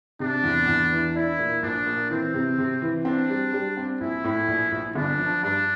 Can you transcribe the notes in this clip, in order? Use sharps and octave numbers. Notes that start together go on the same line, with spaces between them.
C3 D4
E2
E2
E3
D4 E4
A#2
A#1 D4
A#2
E3 C4
C3
C3
E3
C4 D4
G3
G3
C4
A#1 E4
A2
A#1
A#1
G1 D4
F3
G2 D4